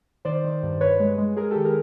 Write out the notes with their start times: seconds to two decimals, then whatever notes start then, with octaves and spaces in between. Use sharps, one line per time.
0.25 D#3 C5 D5
0.44 D#3
0.63 G2
0.81 G2 B4 C#5
1.00 G#3
1.18 G#3
1.37 G#3 G#4 A#4
1.51 D#3 G4 A4
1.65 G#4 A#4